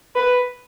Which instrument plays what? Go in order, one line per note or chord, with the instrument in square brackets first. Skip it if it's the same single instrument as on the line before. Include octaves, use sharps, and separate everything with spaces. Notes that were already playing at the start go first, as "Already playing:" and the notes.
[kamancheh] B4